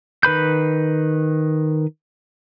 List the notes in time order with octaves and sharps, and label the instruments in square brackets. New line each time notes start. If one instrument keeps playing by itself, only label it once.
[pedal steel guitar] D#3 B4 B5 G6